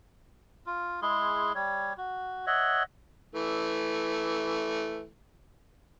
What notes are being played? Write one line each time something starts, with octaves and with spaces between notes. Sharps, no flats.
F4
G#3 E4 G#4 C6
G3 C#5
F#4
C#5 D#5 E5 F#5
E3 A3